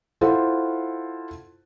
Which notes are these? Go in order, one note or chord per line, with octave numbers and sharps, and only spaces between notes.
E4 F4 A4 C5 F#5